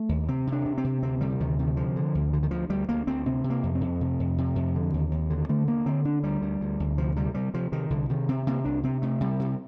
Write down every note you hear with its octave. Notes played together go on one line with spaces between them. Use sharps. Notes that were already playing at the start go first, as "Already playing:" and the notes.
Already playing: A3
D#2
C3 C4
C3
D4
C3
C4
C3
D2 C4
C3 G3
D2 D#3
C3 D#3
D3 F3
D3
D2
D3
D#3
D2 F3
D2 G3
D2 A#3
D2 C4
C3 C4
C3
A#3
F2
C4
F2
C3
F2
C3
F2
D3
D#2
D#2
D3
D3 A3
D3 A#3
D3 C4
D3 D4
D2 G3
D2
D2
D2
C3 F3
C3 G3
C3 G3
C3 F3
C3 D#3
C2 D3
C3 D#3
C3 C4
C3 A#3
C2 D4
C3 C4
C3 A3
C3 G3
C3